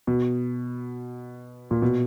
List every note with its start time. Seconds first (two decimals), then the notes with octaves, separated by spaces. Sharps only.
0.07 B2
1.71 A#2
1.82 B2